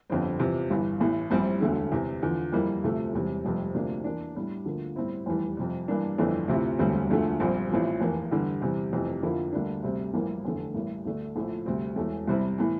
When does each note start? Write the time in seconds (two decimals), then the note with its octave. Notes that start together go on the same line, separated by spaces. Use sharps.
0.10 G1 F2 D3 G3 C4
0.39 E2 C3 F3
0.70 G1 G2 E3
1.00 A1 A2 E3
1.31 A#1 A2 G3 C4 E4
1.61 E1 D2 D3 A3
1.92 E2 C3 E3
2.23 E2 D3 F3
2.52 F2 E3 G3 A#3 E4
2.83 D2 C3 F3 A3
3.13 E1 E2 C3 G3
3.45 F1 F2 C3 G3 C4
3.74 D2 C3 F3 A#3 D4
4.04 E2 E3 A#3 D4
4.35 A2 G3 D4
4.65 D2 D3 F3 A#3
4.96 A2 G3 C4 E4
5.26 F1 E2 E3 G3
5.57 F2 C3 G3
5.88 G2 E3 G3 A#3 D4
6.18 G1 F2 E3 A3 D4
6.48 D2 C3 F3 C4 E4
6.79 E1 D2 D3 G3 C4
7.10 E1 D2 D3 F3 A3
7.40 A#1 A#2 G3 C4
7.70 A1 A2 F3 C4
8.01 F1 E2 E3 A#3
8.31 E2 D3 G3
8.61 E2 C3 E3 G3
8.92 F1 F2 C3 E3
9.22 F2 D3 F3 A#3 E4
9.53 D2 D3 G3 A#3 D4
9.83 D2 C3 G3 C4
10.14 A#1 A2 E3 G3 A#3
10.45 F1 E2 D3 A3
10.74 A1 A2 G3 A#3
11.05 D2 D3 A3 D4
11.36 A#1 A2 F3 A3
11.66 D2 C3 G3 C4
11.96 E1 E2 E3 A3
12.28 C2 C3 G3 C4 E4
12.58 A2 E3